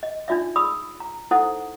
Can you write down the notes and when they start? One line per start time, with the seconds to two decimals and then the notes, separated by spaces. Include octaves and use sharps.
0.03 D#5
0.28 D4 D#4 F4 D5 E5
0.56 G#4 D5 B5 D#6 E6
1.00 A#5
1.31 D#4 E4 A4 C5 F#5 D#6